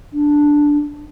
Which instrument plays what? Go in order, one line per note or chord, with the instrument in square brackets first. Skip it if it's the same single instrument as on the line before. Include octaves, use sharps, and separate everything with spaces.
[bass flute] D4